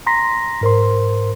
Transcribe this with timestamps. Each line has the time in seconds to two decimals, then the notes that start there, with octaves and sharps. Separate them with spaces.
0.07 A#5 C6 A#6 B6
0.61 G#2 A#4 C5 C6